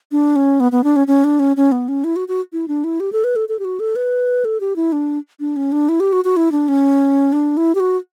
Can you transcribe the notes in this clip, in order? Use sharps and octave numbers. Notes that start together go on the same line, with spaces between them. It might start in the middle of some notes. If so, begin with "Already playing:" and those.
D4
C#4
B3
B3
D4
C#4
C#4
D4
C#4
C#4
B3
C#4
E4
F#4
F#4
E4
D4
E4
G4
A4
B4
A4
A4
G4
F#4
A4
B4
A4
G4
E4
D4
D4
C#4
D4
E4
G4
F#4
F#4
E4
D4
C#4
D4
E4
G4
F#4